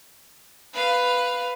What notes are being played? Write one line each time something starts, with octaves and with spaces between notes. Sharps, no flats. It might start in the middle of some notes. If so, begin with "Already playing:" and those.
B4 F5